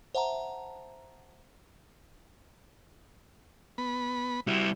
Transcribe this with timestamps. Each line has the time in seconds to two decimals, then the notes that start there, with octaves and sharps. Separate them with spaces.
0.15 C5 E5 F#5 A5 A#5
3.78 B3 B5
4.47 G3 E4 F#4